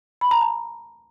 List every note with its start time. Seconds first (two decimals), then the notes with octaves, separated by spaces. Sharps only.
0.21 B5
0.31 A#5
0.41 A5